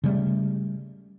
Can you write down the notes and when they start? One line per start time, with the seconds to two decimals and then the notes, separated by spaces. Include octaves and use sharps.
0.04 C#3 G3 A3